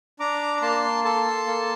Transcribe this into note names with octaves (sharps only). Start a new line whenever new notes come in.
D4 A#5 D6
A#5
A#3 A5 C6
A4 A5 C6
A#3